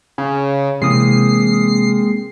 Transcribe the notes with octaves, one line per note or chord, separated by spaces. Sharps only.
C#3 G#5
C3 E3 G#3 A#3 C4 D#6 C7